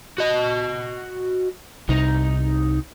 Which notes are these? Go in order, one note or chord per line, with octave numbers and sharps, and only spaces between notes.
F#4 D#5
C2 C3 D#4